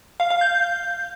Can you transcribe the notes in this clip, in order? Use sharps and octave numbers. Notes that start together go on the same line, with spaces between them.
F5
F5
G6